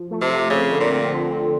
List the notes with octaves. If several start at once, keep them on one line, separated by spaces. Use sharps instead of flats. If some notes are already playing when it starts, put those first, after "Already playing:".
Already playing: F3
A3
C3
F3
C#3 C4
D3
A#2
C4
D3
C4